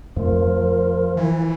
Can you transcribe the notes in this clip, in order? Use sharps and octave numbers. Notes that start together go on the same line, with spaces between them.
F2 F3 A3 A#4
E3